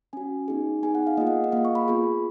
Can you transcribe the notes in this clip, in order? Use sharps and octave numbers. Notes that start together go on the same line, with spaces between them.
C#4 F#4 G#5
B3 D#4 G#4
B3 D#4 G#4 G#5
F#5
F5
A#3 F4 G#4 D#5
F#5
D#5
A#3 F4 G#4 F5
C#6
B5
B3 F4 G#4